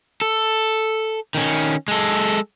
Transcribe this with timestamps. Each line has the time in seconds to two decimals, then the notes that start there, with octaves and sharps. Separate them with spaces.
0.21 A4
1.35 D#3 C#4
1.88 G#3 A4